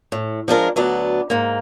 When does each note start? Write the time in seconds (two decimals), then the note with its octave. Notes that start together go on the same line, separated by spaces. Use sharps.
0.12 A2
0.48 F3 G#3 D4 A#4
0.76 D2 F#3 B3 D5
1.30 G#2 A#3